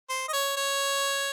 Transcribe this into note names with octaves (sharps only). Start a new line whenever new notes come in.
C5
D#5
C#5
C#5